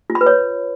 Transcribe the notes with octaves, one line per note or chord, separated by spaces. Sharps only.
F4
B5
B4
C#5